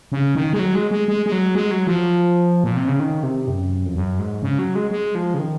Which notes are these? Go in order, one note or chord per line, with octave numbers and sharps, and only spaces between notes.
C#3
D#3
G#3
F#3
G#3
G#3
G#3
G#3
F#3
G#3
F#3
F3
A#2
C3
C#3
D#3
C3
F#2
F2
F#2
G#2
C#3
F#3
G#3
G#3
F3
C#3
D#3